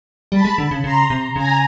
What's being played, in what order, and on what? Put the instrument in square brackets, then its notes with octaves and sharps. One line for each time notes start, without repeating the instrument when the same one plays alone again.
[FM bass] G3 [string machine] A5 B5
[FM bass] G#3
D3
C#3
[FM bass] C#3 [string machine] A#5 C6
[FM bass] C3
[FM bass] C#3 [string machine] G#5 A#5